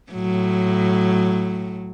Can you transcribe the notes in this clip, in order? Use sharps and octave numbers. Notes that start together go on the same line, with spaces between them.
A2 F#3